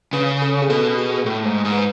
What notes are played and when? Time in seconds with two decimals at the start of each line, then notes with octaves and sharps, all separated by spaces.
0.13 C#3 B4
0.42 A4
0.62 G#4
0.70 B2 A4
0.98 G#4
1.26 A2
1.45 G#2
1.65 G#2
1.72 B4